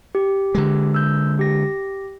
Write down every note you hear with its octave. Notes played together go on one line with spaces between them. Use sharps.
G4
D3 G#3
E6 G6
G4 A#6